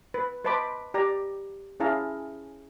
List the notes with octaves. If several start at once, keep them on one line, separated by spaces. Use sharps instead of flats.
B4
B4 C5 D#5 A5 B5 D6
G4 D5 A#5
C#4 E4 G#4 F5 A5 A#5